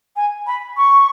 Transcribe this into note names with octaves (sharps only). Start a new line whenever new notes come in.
G#5
B5
C#6